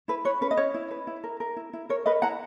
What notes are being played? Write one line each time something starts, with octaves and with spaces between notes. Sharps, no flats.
E4 B4
B4 C#5
C#4 B4
D#5
C#4 C#5
E4
B4
E4
A#4
A#4
E4
E4
A#4 C#5
A#4 B4 D#5
E4 F#5 A#5